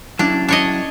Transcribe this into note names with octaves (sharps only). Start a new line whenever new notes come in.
F#3 C#4 D4 E4
D4 C#5 D#5